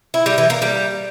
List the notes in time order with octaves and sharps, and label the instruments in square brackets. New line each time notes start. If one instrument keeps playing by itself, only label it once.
[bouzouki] E4
G3
E3
A#3
G3